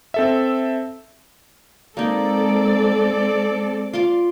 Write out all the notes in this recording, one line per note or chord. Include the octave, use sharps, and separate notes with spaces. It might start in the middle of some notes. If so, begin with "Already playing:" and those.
C4 A4 E5
G#3 A#3 C4 D#4 A4 D5
F4 C6 D6